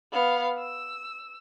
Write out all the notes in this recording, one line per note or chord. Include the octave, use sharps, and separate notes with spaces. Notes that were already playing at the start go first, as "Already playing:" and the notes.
B3 F5
E6